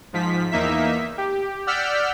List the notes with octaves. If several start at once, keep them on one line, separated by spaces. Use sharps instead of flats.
G#2 F3 B6
E2 A#3 D#4 E5 B6
G4
D5 F#5 E6 F6 G6 B6